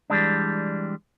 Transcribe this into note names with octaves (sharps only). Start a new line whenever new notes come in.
E3 G3 G#3 D4